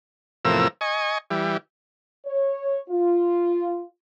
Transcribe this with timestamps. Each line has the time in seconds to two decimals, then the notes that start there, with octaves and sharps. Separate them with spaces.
0.45 E2 A2 C3 F3 A#4 E6
0.81 D#5 G#5 C#6
1.30 E3 G3
2.26 C#5
2.90 F4